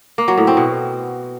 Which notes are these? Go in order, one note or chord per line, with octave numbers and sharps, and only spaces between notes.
A#3
F#3
A2
C4
B2